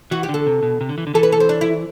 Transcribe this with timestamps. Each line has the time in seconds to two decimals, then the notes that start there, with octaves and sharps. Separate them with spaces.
0.11 E3 F#4
0.23 G4
0.29 D3
0.34 A4
0.47 C3
0.63 B2
0.81 C3
0.89 D3
0.98 E3
1.07 D3
1.14 E3 A4
1.23 B4
1.32 A4
1.40 C4
1.49 D4
1.61 E4